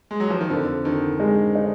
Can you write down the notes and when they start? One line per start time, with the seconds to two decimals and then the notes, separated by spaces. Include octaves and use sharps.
0.11 G#3
0.20 F#3
0.30 F3
0.41 D#3
0.50 F2 D3
0.85 D3 D#3
1.20 G#3
1.55 D#4